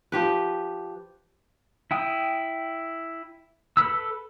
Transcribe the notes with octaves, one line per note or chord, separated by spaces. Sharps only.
F3 G4 B4
E4 G5 D#6
A4 B4 B5 E6